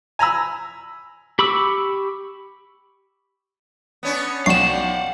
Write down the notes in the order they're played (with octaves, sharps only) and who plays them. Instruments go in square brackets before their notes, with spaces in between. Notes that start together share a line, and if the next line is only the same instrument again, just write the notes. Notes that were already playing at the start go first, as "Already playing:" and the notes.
[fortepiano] G#5 A#5 B5 E6
[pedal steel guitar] G4 B5 C#6 D6 E6
[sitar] B3 C#4 D4
[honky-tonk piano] B1 D5 C#6 [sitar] F3 [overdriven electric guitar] F5 F#5 [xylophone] C7 E7